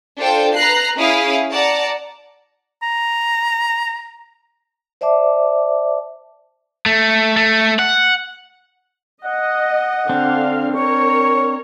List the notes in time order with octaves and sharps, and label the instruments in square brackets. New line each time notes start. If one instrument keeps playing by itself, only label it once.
[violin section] D4 F4 A4 C5 G5
B4 A#5 F#6 C7
C#4 E4 G#4 F5 D#6
D5 F#5 A5 A#5
[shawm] A#5
[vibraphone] C5 D5 E5 A5 D6
[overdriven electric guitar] A3
A3
F#5
[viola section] D#5 [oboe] F#5
[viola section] D3 F5 [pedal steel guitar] C4 D4
[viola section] A#4 C#5 [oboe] C#6